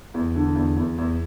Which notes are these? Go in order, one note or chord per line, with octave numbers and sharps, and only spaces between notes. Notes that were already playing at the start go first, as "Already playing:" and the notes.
E2
D3
E2
E2
E2